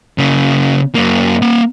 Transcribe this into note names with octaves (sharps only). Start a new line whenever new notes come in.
C#3 A#3
F#2 A#3
A#3 F#5